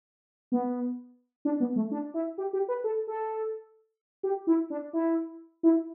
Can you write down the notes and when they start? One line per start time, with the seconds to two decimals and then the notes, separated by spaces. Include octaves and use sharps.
0.52 B3
1.45 D4
1.60 B3
1.76 A3
1.91 D4
2.14 E4
2.38 G4
2.53 G4
2.68 B4
2.84 A4
3.07 A4
4.23 G4
4.47 E4
4.70 D4
4.93 E4
5.63 E4